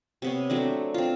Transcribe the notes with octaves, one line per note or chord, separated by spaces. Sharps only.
C3 B3 C#5
F#3 A3 C4 D4
C4 F4